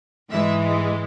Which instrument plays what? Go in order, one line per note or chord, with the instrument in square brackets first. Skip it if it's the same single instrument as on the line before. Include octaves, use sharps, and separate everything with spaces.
[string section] G#2 E3 G#3 E5